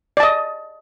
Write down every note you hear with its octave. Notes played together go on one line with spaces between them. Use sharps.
D5 D#5 A5